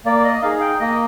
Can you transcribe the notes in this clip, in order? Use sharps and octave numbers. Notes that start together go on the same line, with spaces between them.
A#3 D5
D#5
D#4 G#4 F5
G5
A#3 D#5